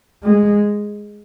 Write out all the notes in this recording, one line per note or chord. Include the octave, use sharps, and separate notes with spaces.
G#3